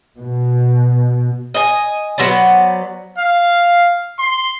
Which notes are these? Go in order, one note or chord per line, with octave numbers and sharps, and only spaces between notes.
B2
D#5 G#5
F#3 B3 C5 D5
F5
C6